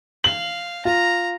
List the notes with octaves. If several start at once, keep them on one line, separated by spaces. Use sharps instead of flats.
F5 F#7
F4 A#5